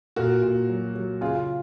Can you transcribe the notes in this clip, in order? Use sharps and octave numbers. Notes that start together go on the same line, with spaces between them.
A#2 F#4 A#4
A#2
F#3
F#3
C#3 F4 G#4
F4